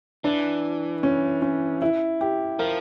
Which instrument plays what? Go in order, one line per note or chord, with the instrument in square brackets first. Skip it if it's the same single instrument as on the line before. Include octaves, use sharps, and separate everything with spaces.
[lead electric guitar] E3 [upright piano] D4
[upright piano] C#4
C#4
E4
G4
[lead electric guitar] F3 [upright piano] A#4